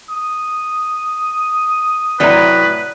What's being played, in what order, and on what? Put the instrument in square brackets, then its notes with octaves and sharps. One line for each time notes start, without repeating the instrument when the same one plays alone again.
[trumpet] D#6
[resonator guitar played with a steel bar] A2 C3 F#3 [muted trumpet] B4 [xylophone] D5 A#5